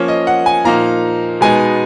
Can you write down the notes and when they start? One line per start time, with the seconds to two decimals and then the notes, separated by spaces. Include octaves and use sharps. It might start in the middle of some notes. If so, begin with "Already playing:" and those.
Already playing: F3 A#3 C#4 C#5
0.08 D#5
0.27 F#5
0.46 G#5
0.64 A#2 F3 A#3 D#4 A#5
1.41 B2 G#3 B3 D#4 G#5